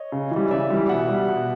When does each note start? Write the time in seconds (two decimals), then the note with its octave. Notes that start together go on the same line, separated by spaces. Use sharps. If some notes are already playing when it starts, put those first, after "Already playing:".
Already playing: C#5 D#5
0.12 C#3
0.31 E3 G3
0.51 C#3 D5 E5
0.70 E3 G3
0.89 B2 E5 F#5
1.09 G3
1.28 B2